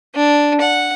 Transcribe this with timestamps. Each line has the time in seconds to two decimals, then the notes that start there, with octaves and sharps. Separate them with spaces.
0.15 D4
0.61 F#5